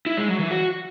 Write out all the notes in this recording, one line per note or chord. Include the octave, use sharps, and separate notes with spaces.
E4
G#3
F#3
E3
F#4